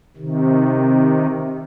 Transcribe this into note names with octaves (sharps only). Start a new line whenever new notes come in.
C3 D#3